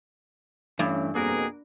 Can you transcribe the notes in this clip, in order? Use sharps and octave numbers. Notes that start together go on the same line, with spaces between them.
G2 E3 A3 C#4
F2 B2 A#3 F#4 G#4 A#4